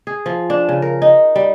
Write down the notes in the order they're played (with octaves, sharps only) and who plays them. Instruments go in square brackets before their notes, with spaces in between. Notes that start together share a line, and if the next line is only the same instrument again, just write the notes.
[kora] G#4
F3
D4
C#3
A#4
D#4
G3